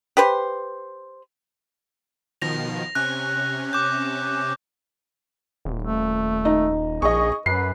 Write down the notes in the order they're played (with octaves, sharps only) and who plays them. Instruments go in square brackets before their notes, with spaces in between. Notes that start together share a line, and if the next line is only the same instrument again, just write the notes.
[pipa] G4 B4 C5
[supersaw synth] B2 D#3 F3 [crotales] A#6 F7
[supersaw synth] C3 C#4 [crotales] F#6
[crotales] D6 G6
[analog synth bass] D#1
[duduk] A3
[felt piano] D#4
[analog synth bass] A#1 [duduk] G#4 [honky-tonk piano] D#5 C#6
[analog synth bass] F#2 [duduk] B4 [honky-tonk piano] C7